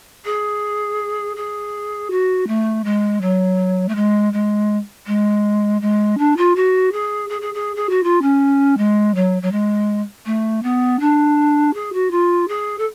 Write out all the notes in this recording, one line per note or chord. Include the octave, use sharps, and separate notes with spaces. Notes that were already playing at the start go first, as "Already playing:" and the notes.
G#4
G#4
F#4
A3
G#3
F#3
A3
G#3
G#3
G#3
G#3
D4
F4
F#4
G#4
G#4
G#4
G#4
G#4
F#4
F4
C#4
G#3
F#3
F#3
G#3
A3
B3
D4
G#4
F#4
F4
G#4
A4